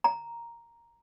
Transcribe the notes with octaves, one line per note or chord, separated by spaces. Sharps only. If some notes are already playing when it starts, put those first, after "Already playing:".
A#5